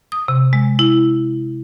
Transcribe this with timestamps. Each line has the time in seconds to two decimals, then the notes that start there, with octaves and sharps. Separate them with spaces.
0.12 D#6
0.28 C3
0.53 G#3
0.79 E4